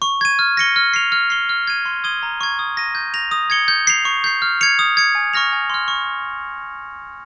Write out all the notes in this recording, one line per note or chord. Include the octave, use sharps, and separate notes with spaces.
C#6
G#6 D#7
F6
A#6 C#7 G7
F6
C7 F7
F6
C7 G7
F6
G#6 D#7
C6
D#6 G#6 D#7 G7
A#5
C#6 G#6
D#6
A#6 D#7
G6
A#6 F7
D#6
G#6 C#7 G7
G6
C7 F7
C#6
G6 C7
F6
G#6 C#7 F7
D#6
G#6 C#7
G#5
C#6 F6 A#6 F7
G#5
C6 F6
C#6